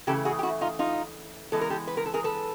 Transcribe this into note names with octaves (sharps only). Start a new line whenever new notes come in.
C#3 E3 A3 G4 A4
F#4 G#4
G4
E4 F#4
D#4 F4
D#4 F4
E3 G#3 B3 A4
A#4
G4 A4
B4
A#4
A4
G#4 A#4
A4 B4